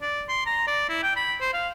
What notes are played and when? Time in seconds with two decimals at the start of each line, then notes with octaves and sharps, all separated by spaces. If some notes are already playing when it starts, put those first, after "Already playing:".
0.01 D5
0.29 C6
0.46 A#5
0.67 D5
0.89 E4
1.03 G5
1.16 B5
1.41 C5
1.54 F5